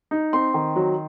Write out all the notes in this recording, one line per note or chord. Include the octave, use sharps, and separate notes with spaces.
D#4
C4 C6
D#3
F#3